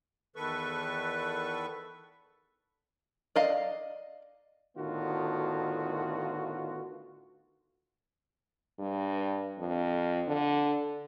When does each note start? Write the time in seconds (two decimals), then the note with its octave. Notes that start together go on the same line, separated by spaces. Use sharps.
0.36 E2 D#3 A4 B4 C#6
3.36 D5 D#5 F5
4.77 A2 D3 D#3 B3 F4 F#4
8.79 G2
9.59 F2
10.27 D3